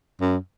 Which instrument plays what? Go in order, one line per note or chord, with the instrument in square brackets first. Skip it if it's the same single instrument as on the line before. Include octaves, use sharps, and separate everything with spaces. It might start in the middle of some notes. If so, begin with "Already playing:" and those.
[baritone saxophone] F#2